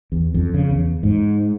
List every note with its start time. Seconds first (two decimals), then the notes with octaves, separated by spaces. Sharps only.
0.12 E2
0.34 F2
0.54 C#3
0.71 E2
1.03 G#2